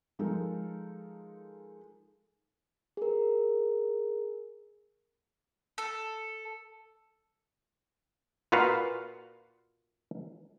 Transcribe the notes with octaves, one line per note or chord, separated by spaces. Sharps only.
F3 G#3 D#4 A4 A#4
G#4 A#4
A4
A#2 F4 F#4 B4 F5